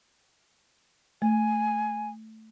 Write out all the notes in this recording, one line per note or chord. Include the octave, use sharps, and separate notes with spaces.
A3 G#5